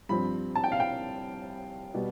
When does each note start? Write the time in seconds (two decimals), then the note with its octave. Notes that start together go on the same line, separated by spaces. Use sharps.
0.09 G2 F3 C4 B5
0.55 A5
0.64 G5
0.72 F5
0.80 G5
1.94 B2 G3 B3